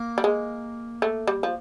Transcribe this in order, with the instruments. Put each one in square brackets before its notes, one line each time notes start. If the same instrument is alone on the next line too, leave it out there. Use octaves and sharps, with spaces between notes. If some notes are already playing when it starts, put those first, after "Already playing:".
Already playing: [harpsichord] A#3
[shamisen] G3
G#3
A3
G3
F3